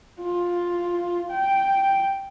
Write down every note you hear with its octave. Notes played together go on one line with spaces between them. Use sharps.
F4
G5